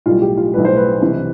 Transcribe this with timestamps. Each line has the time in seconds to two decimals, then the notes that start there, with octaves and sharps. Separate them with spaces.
0.06 B1 A2 G3 F4
0.22 G4
0.37 F4
0.54 B1 A2 G3 B4
0.65 C5
0.76 B4
1.01 C2 C3 E3